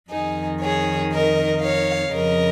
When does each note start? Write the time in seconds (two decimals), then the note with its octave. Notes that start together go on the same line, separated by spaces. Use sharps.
0.10 F2 D#3 D#4 G#4
0.62 G#4 C#5
1.13 A#4 D#5
1.63 C#5 F5
2.14 F2 C#3 F3 A#4 D#5